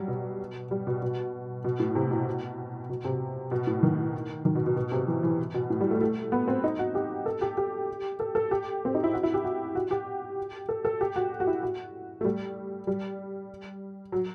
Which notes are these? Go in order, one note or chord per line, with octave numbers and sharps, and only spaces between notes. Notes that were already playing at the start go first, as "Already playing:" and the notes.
Already playing: F#3 G3
B2
G3
B2
B2
B2
A2
C3
B2
B2
C3
B2
A2
D#3
D#3
B2
B2
B2
C3
E3
E3
B2
A2
G3
A3
A3
B3
C4
D#4
F#4
G4
A4
G4
G4
A4
A4
G4
C4
D#4
E4
F#4
E4
G4
F#4
F#4
G4
A4
A4
G4
F#4
F#4
E4
F#4
A3
G3
G3
F#3